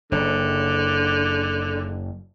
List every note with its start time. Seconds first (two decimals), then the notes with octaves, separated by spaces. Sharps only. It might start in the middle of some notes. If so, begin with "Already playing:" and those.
0.12 F#1 D3